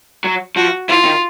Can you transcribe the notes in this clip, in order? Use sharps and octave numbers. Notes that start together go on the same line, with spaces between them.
F#3
F3 F#4
E3 F4
D#3